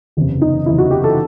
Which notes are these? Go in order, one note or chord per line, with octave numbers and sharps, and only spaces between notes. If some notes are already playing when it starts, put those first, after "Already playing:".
F#1 E2 C3
D#4
F#1 E2 C3 E4
F#4
G4
A4